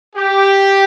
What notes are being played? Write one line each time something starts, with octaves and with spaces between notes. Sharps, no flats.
G4